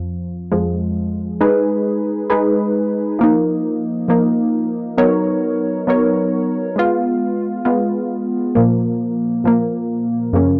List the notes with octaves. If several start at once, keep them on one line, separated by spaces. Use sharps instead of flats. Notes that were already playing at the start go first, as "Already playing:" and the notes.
Already playing: F2 F3
F2 F3 G#3
G#3 D#4 G#4 B4
G#3 D#4 G#4 B4
F3 A#3 D#4
F3 A#3 D#4
F#3 B3 D#4 A#4 C#5
F#3 B3 D#4 A#4 C#5
G#3 B3 F4
G#3 B3 F4
A#2 F3 A#3
A#2 F3 A#3
F#2 C#3 F3 A#3 C#4